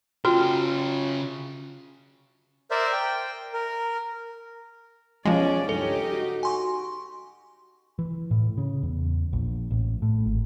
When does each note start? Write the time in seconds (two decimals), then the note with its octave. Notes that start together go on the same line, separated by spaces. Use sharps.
0.25 C#3 F4 F#4 G5
2.71 A#4 C5 D5 E5
2.92 G5
3.53 A#4
5.25 D#2 B2 F3 G#3 C#4 D5
5.69 C#2 G2 C#4 D#4 G4 A4
6.12 F#4
6.43 G#5 C6 C#6
7.99 E3
8.31 A2
8.58 C#3
8.83 E2
9.33 A#1
9.71 A1
10.02 A2
10.26 G#1